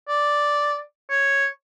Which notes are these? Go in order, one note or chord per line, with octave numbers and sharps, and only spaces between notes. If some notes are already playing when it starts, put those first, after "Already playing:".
D5
C#5